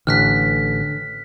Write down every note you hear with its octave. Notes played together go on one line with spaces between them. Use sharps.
A1 D3 F6 F#6 B6